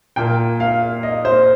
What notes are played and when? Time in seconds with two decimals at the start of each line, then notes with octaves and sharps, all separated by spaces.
0.16 A#2 A#3 G5
0.60 F5
1.03 D#5
1.25 C5